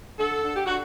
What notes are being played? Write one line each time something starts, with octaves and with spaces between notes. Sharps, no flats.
D3 A4
D3
G4
D3 F#4